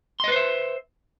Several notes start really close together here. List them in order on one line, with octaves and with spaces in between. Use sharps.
C6 D#5 B4 C5 E5